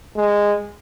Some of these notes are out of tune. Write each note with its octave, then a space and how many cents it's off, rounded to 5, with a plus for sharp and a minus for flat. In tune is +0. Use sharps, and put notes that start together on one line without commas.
G#3 -15